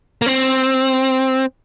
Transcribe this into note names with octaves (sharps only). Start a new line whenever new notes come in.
A#3
C4